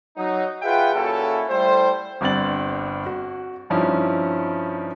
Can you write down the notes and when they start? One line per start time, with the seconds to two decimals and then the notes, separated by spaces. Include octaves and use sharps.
0.17 F#3 D#4
0.63 F4 G#4 B4 E5 F#5 G5
0.94 A#2 C#3 C#4 E4 F#4 A4
1.49 G3 A3 E4 C5
2.21 G1 G2 C4 A6 F#7
3.06 F#4
3.70 G2 F3 C#4 D#4 E4